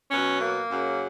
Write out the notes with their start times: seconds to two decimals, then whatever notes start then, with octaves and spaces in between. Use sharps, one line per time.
0.11 B2 F#3 C#4
0.41 A#3
0.71 F#2 C#3 F#3